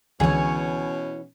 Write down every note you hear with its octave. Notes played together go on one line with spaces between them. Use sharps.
C#2 B2 D3 E3 C#4 G#4 C#5 G#5